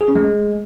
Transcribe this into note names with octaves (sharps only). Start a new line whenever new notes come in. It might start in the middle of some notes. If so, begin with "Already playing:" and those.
G#4
C#4
G#3